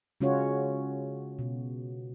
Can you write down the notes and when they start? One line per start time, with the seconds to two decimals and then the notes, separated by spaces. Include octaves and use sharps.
0.21 C#3 G#3 C#4 F4 F#4 C#5
1.39 B2